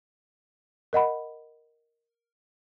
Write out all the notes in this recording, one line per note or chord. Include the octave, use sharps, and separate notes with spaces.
A#4 D#5 F#5 B5